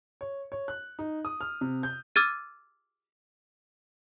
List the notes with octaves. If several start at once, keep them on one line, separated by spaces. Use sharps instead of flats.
C#5
C#5
F#6
D#4
D#6
F6
C3
G6
D6 E6 F6 G#6 A6 D#7